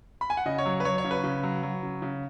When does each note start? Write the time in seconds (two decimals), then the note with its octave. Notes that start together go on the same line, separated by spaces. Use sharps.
0.21 B5
0.30 G#5
0.37 F#5
0.46 C#3 D#5
0.58 C#5
0.66 F#3
0.80 B4
0.85 F#3 C#5
0.98 C#5
1.04 C#3
1.11 B4
1.24 C#3
1.43 F#3
1.63 F#3
1.83 C#3
2.02 C#3